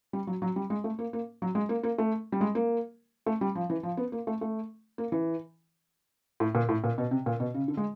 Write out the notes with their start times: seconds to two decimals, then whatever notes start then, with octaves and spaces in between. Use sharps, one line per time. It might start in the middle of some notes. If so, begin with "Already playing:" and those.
0.13 G3
0.27 F#3
0.42 F#3
0.56 G3
0.70 G#3
0.84 A3
0.99 A#3
1.13 A#3
1.42 F#3
1.55 G#3
1.69 A#3
1.83 A#3
1.98 A3
2.32 G3
2.41 G#3
2.55 A#3
3.26 A3
3.41 G3
3.55 F3
3.70 E3
3.83 F3
3.97 B3
4.12 A#3
4.27 A3
4.41 A3
4.98 A#3
5.12 E3
6.40 A2
6.55 A#2
6.69 A2
6.84 A#2
6.98 B2
7.11 C3
7.26 A#2
7.40 B2
7.54 C#3
7.68 D3
7.77 G#3